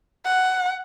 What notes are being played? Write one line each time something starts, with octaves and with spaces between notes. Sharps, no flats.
F#5